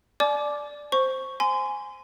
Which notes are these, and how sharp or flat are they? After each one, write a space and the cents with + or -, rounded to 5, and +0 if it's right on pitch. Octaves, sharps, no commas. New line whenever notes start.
D5 +0 G#5 +45 D6 +0
C5 +0 C#6 +0
G#5 +0 C6 -25